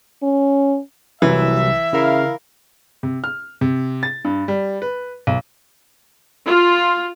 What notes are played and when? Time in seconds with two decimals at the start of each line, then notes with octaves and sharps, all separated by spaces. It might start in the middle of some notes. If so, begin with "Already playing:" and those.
0.23 C#4
1.22 C2 C3 E3 F#3 E5
1.93 C#3 E4 A#4 F5
3.03 C3
3.24 F6
3.61 C3
4.03 A6
4.25 G2
4.48 G3
4.82 B4
5.27 B1
6.46 F4